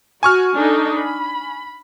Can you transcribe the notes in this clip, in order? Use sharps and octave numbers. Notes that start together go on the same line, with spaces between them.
F#4 G#5 C#6 F6
D4 D#4 A4
B5